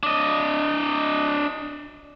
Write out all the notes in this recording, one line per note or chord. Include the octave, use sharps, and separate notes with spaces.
D4 D#5